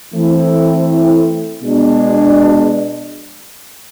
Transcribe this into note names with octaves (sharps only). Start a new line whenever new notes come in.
E3 A3 C4 E4
B2 G#3 D4